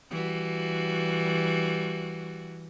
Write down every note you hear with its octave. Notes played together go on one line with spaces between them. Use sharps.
E3 G3 F#4